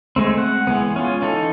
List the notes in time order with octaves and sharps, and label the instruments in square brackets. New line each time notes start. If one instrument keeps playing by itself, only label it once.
[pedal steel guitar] G#3 A3 C4
F#5
E3 G#3 B3
C#4 F4
E3 D#4 A4